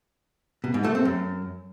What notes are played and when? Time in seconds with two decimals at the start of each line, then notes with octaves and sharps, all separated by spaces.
0.64 B2
0.74 G#2
0.85 A3
0.95 C4
1.05 F#2